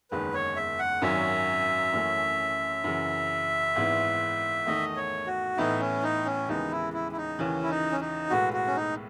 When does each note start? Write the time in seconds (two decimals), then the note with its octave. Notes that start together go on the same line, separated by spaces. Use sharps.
0.11 F#1 E2 D#3 G#3 D#4 B4
0.34 C#5
0.56 E5
0.79 F#5
1.02 G#1 F#2 D#3 F#3 C#4 E5
1.93 F#2 E3 A3 C#4
2.84 F#2 C#3 E3
3.75 G#1 G#2 E3 B3 E4
4.66 E2 D#3 A3 D#4 D#5
4.97 C#5
5.27 F#4
5.57 A2 E3 B3 D#4 E4
5.80 C#4
6.03 D#4
6.25 C#4
6.48 D#2 C#3 E3 G#3 B3 D#4
6.71 E4
6.93 E4
7.12 E4
7.17 D#4
7.39 D#2 C#3 E3 C#4
7.63 E4
7.70 D#4
7.92 C#4
8.01 D#4
8.30 B1 A2 G#3 B3 F#4
8.53 F#4
8.67 C#4
8.76 D#4